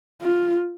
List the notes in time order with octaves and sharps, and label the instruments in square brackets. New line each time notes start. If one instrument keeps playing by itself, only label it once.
[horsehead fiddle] F4